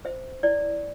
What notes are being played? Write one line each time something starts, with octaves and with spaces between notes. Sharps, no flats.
C5 E5
E4 D5